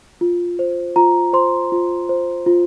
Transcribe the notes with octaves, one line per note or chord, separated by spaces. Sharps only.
F4
C5
F4 A#5
C5 C6
F4
C5
F4